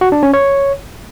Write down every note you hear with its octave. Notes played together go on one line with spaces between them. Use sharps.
F#4
D4
C#4
C#5